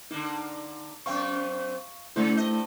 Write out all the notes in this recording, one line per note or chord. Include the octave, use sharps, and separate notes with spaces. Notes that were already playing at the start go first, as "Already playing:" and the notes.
D3 A#3 D#4
F#2 C4 F5 C#6
C#3 A3 D#4 E4 C5
G2 D#5